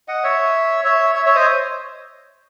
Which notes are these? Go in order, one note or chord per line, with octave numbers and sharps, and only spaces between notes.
D#5 F#5
C#5 E5
C#5 E5
C#5 E5
C#5 E5
C5 D#5